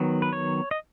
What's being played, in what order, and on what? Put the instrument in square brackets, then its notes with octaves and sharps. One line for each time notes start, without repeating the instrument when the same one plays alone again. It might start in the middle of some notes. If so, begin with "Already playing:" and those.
Already playing: [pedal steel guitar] D#3 F#3 B3
B4
C#5
D#5